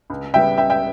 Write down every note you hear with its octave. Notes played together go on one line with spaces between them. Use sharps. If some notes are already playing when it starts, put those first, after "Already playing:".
C#2
C#3 G3 B3 E5 G5
C#2 E5 G5
E5 G5